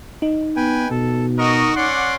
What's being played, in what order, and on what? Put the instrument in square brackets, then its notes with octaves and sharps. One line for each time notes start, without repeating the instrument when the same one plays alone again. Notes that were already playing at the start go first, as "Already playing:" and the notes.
[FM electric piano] D#4
[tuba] B3 [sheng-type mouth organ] B4 G5 G#5
[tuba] B2 [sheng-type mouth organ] A4
[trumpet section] F#4 A#4 D#5 [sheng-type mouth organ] C#6
[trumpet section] C#4 D5 F#5 [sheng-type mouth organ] C6 D6